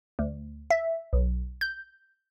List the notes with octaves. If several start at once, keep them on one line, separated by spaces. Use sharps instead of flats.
D2
E5
B1
G6